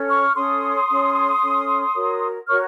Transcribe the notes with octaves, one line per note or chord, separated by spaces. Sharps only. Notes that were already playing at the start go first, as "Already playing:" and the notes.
Already playing: C#4 A4 C#5
C#6 F6
C#4 A4 C#5 C6 D#6
C#4 A4 C#5
C#4 A4 C#5
F#4 A#4 C#5
F#4 A#4 C#5 C#6 F6